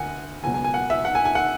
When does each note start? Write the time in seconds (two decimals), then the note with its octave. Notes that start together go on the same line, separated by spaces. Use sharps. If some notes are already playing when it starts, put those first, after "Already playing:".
Already playing: D2 F#5 G#5
0.44 C#2 B2 F#3 B3 G#5
0.54 G#5
0.64 G#5
0.74 F#5
0.90 E5
1.05 F#5
1.15 G#5
1.25 G#5
1.35 F#5